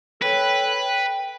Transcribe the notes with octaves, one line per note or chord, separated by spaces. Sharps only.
A4 B4 C#5 G5
G5